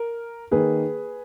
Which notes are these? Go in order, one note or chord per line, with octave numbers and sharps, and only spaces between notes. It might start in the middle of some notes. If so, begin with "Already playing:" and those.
Already playing: A#4
D#3 A#3 G#4 B4